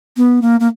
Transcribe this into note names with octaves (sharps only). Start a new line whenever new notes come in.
B3
A#3
A#3